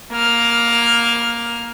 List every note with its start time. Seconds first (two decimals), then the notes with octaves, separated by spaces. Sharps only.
0.13 A#3 F6